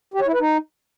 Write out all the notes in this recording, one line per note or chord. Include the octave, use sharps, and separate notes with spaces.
G4
C#5
E4
B4
D#4